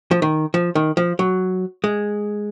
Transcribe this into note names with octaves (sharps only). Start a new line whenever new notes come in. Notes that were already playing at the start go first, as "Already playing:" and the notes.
F3
D#3
F3
D#3
F3
F#3
G#3